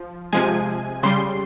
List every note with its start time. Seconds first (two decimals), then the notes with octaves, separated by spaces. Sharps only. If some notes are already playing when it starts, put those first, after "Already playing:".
Already playing: F3
0.33 C3 F3 G#3 G#5
1.03 C#3 G3 C6